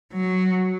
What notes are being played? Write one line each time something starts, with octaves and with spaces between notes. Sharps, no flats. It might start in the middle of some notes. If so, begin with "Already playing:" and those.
F#3